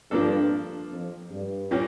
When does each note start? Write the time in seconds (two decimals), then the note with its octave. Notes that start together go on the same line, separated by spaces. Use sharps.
0.11 G2 F3 A#3 D4 A4
0.91 F2
1.31 G2
1.71 A#2 G3 A#3 C#4